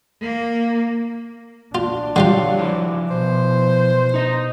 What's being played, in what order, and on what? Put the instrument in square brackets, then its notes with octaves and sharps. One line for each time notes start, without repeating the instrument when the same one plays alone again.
[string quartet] A#3
[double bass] D4 [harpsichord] F4
[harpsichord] D3 G3 F4 [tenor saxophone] F#3 [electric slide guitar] F5
[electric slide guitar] F3 E4
[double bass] B2 [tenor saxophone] C5
[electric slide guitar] D#4 D#5